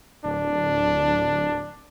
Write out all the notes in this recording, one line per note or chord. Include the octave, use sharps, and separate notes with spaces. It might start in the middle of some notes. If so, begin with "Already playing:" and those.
D1 D4